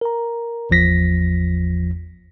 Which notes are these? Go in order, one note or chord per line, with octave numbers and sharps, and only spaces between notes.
A#4 A#5
G#1 E2 F3 A#6 B6